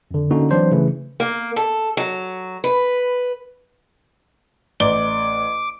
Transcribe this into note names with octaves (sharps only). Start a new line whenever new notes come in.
F2 D3
D3 A#3 C#4 D#4 F#4
E3 F#3 C4 D4 C5 D5
C#3 E3 A3
A#3
A4
F#3
B4
A1 D5 D6 G7